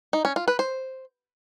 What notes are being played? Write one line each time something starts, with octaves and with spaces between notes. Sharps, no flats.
D#4
C#4
F4
B4
C5